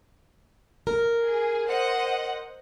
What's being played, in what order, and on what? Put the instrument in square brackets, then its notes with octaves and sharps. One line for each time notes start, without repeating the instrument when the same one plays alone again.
[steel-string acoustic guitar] A#4
[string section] G#4
C5 D#5 F#5